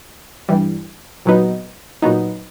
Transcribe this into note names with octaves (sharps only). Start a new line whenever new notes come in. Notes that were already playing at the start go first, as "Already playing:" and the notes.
G2 E3 G3
A#2 F#3 B3 D#4
A#2 F#3 B3 D#4